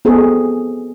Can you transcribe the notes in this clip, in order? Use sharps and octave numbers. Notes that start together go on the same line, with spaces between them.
B3 C4 G#4 A4